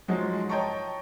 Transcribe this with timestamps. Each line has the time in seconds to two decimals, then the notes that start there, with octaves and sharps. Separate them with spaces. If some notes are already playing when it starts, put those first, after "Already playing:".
0.08 G#2 F3 F#3 G#3
0.49 C#5 D#5 G5 A5 A#5 C#6